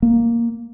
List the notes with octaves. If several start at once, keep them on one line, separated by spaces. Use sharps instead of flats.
A#3